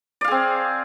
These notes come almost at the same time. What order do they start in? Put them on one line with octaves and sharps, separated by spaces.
D5 F5 G#4 C4